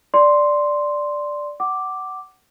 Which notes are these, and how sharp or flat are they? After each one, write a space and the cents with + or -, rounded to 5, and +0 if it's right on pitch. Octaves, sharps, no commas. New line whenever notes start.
D5 +0 C6 +0
F#5 +20 D6 +0